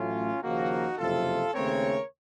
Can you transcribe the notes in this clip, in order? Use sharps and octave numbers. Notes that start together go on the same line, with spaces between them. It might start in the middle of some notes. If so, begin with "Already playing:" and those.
Already playing: A1 A2 F#3 A3 C#4 F4
D#2 C#3 F3 A#3 D#4 F#4
F#1 F2 C3 F4 A4
D#2 C#3 A3 C4 A#4 C#5